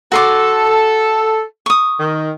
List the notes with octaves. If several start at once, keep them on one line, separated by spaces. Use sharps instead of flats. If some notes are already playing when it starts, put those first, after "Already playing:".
F#4 A4 C6 D6
C#6 D#6
D#3